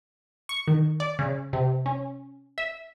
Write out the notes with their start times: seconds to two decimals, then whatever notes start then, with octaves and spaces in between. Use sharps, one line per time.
0.49 C#6
0.68 D#3
1.00 D5
1.19 C#3
1.53 C3
1.86 C#4
2.58 E5